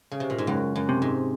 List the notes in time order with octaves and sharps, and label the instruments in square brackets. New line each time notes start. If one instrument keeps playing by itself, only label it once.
[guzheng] C#3
C3
A#2
G#2
[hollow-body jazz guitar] C#2 [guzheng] F#2
[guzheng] F#2
[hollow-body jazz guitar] C3
[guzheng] G#2